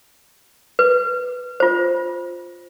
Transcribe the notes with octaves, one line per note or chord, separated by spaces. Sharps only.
B4
F4 C5